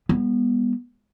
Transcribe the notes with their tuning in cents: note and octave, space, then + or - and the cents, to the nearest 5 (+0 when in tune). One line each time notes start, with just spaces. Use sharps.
G3 +40 B3 -20